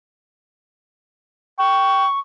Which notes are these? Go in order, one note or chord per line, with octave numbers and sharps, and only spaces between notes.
G5 C#6